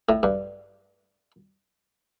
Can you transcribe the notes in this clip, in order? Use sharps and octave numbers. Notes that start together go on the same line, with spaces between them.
A2
G2